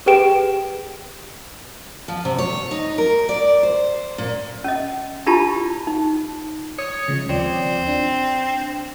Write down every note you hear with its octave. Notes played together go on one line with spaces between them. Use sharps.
G4 G#4 B4 G5 D7 E7
F3
C3
C#5
D#4
A#4
D5
C5
A#2
C#4 D#5
D4 E4 F4 G4 A5 B5
D#4
C#5 D#6
C#3 F3 G#3
D#2 F3 C4 D5
D4